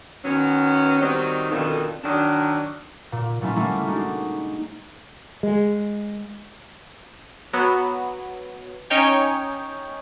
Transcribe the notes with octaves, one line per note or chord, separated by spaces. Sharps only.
D#3 F#3 B3 C#4
D#3 F#3 G3 C4 D#4
F2 B2 D3 D#3
D#3 F#3 D4
A#2
A#2 F#3 A3 C#4 E4 F4
G3 A3 A#3 C#4 E4 A#4
G#3 D4 D#4 F#4
G#3
F#3 B3
C#4 D#4 C#5 G5